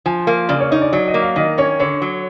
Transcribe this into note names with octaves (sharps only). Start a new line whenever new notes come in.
F3 G#5
A#3
C#3 D5
C#5
D#4 C#5
D5
F#3 D5
D#5
A#3
F5
D#3 D#5
C#4 C#5
D3 C#5
F#3